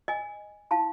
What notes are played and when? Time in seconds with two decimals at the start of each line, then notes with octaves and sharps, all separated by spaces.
0.08 D#5 G#5
0.71 E4 F5 A5 C6